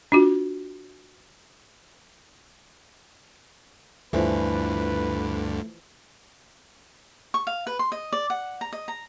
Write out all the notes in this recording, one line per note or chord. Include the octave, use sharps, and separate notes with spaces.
D4 F4 F#4
D2 G2 D3 E3 F3 A3 B4 B5
C#6
F5
B4
C6
D#5
D5
F#5
A#5
D#5
A#5